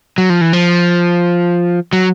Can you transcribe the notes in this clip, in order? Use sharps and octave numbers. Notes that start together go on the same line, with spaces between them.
F#3
F3
E3
F3
F#3